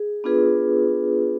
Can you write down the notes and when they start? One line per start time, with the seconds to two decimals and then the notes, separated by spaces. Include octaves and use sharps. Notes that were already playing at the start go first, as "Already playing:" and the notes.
Already playing: G#4
0.24 B3 D4 F4 G#4 B4